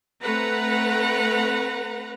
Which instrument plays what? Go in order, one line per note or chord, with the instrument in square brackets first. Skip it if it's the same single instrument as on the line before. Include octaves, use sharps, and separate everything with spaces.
[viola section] A3 C4 B4 F#5 A#5